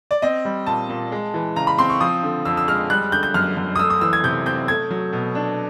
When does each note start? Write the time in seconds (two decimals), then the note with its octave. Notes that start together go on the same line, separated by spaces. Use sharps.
0.11 D5
0.22 C4 D#5
0.45 G3
0.67 A#2 A5
0.89 A#2
1.12 G#3
1.34 E3
1.56 C#3 A#5
1.67 B5
1.78 C4 C6
1.90 C#6
2.01 F3 D#6
2.23 D3
2.45 F2 E6
2.57 E6
2.68 G#3 F6
2.90 G3 F#6
3.12 D3 G6
3.23 G6
3.34 F#2 F6
3.57 F#2
3.75 D#6
3.79 A3 E6
3.90 D#6
4.01 E3 E6
4.13 G#6
4.24 C3 G6
4.46 C4 G6
4.68 A3 G#6
4.90 F#3
5.13 B2
5.35 D4